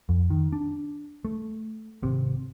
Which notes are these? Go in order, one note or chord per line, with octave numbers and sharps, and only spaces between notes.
F2
D#3
D4
A3
G#1 C3